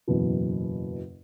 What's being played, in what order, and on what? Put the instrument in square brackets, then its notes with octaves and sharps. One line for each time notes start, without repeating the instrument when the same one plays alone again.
[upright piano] F#1 E2 B2 F#3